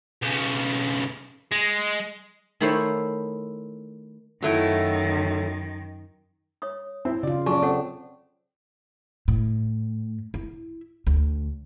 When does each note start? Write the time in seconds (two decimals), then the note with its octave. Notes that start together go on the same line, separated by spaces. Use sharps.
0.22 B1 C#3
1.52 G#3
2.60 D#3 A3 E4 A4 C5 C#5
4.42 F#2 D#3 F#3 A3 E4
6.62 C#5 D#6
7.05 C4 E4
7.23 C#3 F4 D5
7.46 F#3 C#4 D4 G#4 G#5 C#6
7.62 C4 A4 C#5 F#5
9.28 A2
10.34 E4
11.07 D2